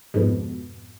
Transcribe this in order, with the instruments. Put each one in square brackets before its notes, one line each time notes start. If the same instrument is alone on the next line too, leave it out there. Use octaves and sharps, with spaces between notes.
[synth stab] F2 G#2 B2